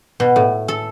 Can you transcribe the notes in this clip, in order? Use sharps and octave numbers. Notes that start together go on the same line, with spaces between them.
B2
A2
A4